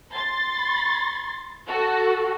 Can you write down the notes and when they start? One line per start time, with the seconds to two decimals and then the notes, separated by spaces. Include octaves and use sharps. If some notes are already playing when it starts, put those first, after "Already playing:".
0.15 C6 A6
1.68 F#4 A4